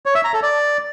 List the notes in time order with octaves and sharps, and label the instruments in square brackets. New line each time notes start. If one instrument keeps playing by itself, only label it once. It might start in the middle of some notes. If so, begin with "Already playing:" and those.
[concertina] C#5
E5
A#5
A4
D5